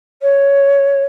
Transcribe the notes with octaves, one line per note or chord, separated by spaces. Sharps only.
C#5